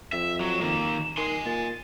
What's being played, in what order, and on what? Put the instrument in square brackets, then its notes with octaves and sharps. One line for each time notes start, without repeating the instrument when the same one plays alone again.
[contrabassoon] F2 [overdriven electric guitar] E5 [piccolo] E7
[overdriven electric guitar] F#3
D#3 A#3
[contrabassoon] D#3 [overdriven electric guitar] G#5 C6 [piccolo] C7
[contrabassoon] A#2 [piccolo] A6